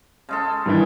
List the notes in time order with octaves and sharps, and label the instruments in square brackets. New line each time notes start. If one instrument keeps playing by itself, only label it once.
[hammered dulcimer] C#3 G#3 A4
[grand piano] G2 D#3 E3